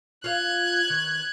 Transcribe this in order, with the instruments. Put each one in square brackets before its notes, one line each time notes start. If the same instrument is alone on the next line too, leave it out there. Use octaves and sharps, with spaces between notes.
[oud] F4 F5 [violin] F#6 G#6
[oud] D#3